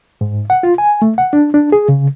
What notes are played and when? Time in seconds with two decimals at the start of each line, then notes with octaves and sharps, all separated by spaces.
0.21 G#2
0.50 F#5
0.63 F4
0.78 G#5
1.02 A3
1.18 F#5
1.33 D4
1.54 D4
1.72 G#4
1.89 C#3